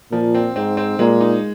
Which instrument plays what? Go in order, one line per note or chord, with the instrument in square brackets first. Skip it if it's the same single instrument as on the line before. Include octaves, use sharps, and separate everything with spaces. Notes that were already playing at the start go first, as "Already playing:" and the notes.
[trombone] A#2 [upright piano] F3
[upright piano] C4
[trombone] G#2 [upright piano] C4
[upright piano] C4
[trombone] A#2 [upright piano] G#3
[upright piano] D#4